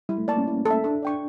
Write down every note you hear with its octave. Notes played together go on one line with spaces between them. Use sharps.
G3 E4
A3
A#3 A#4 D5 A5 C#6
C#4
E4
A4
E5
D4 A4
D5 G5 C#6